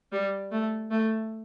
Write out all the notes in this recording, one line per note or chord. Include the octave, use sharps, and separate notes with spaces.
G3
A3
A3